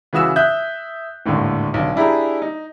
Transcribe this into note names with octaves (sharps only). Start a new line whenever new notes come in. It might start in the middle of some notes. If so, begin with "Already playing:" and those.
C#3 E3 F#4 D#6 E6 E7
E5 D#6 F#6 G6
G#1 D#2 A2 D3
B1 D3
D4 E4 G4 G#4 A#5
D#4